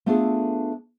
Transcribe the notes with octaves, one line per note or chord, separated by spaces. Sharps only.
A3 B3 D4 F4 G#4 A4